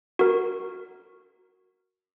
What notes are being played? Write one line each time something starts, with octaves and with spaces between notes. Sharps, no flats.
F#4 A#4